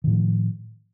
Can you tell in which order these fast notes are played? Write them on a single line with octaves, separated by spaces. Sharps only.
D#3 A2 F3